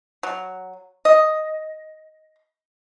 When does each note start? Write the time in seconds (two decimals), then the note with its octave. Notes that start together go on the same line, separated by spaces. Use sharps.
0.23 F#3
1.05 D#5